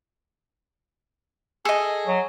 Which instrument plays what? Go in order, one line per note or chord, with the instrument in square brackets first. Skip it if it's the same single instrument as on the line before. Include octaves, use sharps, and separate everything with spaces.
[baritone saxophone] G#4 [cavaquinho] A4 D#5
[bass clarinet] F#3